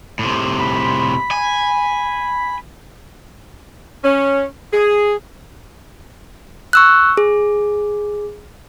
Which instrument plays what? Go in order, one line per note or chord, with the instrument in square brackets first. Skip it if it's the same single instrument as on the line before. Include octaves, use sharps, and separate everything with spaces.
[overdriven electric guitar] A2 C3
[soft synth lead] B5
[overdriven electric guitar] G#5
[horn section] C#4
G#4
[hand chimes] C#6 E6 F#6
G#4